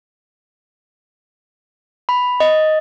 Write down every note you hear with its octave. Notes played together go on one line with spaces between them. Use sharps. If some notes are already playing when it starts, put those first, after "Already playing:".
B5
D#5